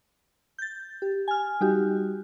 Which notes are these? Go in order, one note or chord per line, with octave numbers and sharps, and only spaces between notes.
G6 A6
G4
G#5 F6
G3 D#4 F#4 G4